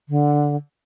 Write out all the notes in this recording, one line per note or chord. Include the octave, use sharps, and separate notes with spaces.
D3